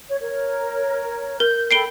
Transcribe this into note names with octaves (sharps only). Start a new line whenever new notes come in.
C#5
A#4 C#5
A#4 G6
A4 G5 B5 C7 D7 G7